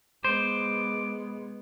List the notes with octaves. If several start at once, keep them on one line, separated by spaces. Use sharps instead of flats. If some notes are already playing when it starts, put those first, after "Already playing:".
G#3 B3 C5 D6